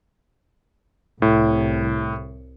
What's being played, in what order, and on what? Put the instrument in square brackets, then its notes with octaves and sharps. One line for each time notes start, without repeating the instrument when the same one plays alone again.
[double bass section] C2 [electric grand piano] A2